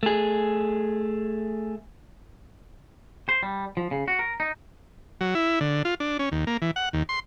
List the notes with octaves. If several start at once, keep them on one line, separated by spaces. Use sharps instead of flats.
A3 G#4
C5
G3
F3
C#3
F#4
A#4
D#4
F#3
E4
D3
F4
D4
C#4
D#2
A#3
E3
F#5
D#2
C6